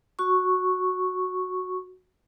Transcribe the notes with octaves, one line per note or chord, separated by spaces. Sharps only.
F#4 C#6